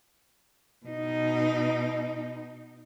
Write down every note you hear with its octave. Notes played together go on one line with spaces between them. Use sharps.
B2 D#4